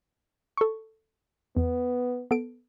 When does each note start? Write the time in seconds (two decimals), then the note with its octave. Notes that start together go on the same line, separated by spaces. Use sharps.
0.57 A4 C#6
1.57 E2 B3
2.31 B3 A4 D7